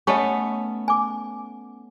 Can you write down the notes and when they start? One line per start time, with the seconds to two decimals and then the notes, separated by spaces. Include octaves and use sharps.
0.07 A3 B3 C#4 D#5 C#6
0.88 G#5 D6